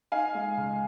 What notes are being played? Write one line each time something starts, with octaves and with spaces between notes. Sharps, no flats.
D#4 F5 G#5
G#3
C#2